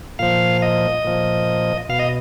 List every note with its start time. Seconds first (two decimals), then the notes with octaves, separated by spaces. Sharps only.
0.19 A#2 F3 F5
0.62 D#5
1.05 A#2 F3
1.89 B2 F5
1.99 D#5